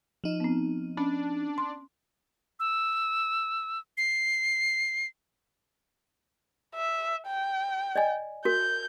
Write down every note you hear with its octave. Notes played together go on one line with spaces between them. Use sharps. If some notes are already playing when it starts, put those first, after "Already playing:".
F3 D#4
B3 C4
C#4 D4
C6
E6
C7
E5
G5
D5 D#5 G#5
F#4 A#4 G6